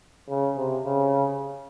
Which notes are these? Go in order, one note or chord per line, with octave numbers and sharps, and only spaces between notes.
C#3
C3
C#3